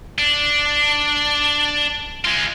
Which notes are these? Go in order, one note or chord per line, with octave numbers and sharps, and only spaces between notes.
D4
G#3 F4